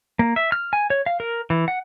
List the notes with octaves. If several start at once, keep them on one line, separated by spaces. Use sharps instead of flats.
A#3
E5
F6
G#5
C#5
F5
A#4
E3
F#5